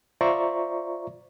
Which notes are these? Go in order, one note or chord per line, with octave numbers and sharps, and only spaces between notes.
F4 C5 D5 E5 A#5 C#6